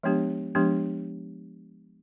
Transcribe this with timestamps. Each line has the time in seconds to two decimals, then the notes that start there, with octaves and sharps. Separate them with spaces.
0.03 F3 G#3 B3 D4 G4
0.55 F3 G#3 B3 D4 G4